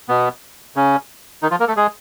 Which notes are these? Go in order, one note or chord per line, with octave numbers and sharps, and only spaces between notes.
B2 B3
C#3 C#4
D#3 D#4
F3 F4
A#3 A#4
A3 A4
G#3 G#4